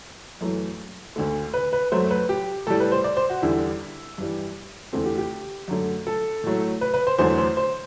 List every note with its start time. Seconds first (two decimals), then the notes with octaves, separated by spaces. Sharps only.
0.41 F#2 E3 A3
1.16 D2 D3 A3
1.54 B4
1.73 B4
1.92 F#2 F#3 A3 C5
2.11 B4
2.29 G4
2.67 A2 G3 A4
2.80 B4
2.92 C5
3.04 D5
3.17 C5
3.30 F#4
3.42 E2 D3 G3 E4
4.18 G2 E3 G3
4.93 E2 D3 A3 C4
5.06 G4
5.18 G4
5.68 F#2 D3 A3
6.07 A4
6.44 A2 F#3 A3
6.81 B4
6.94 B4
7.07 C5
7.19 E2 D3 F#3 A3 C5
7.38 C5
7.57 C5